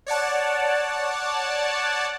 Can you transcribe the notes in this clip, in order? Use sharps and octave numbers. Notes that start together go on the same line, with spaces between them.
C#5 D5 F#5 A5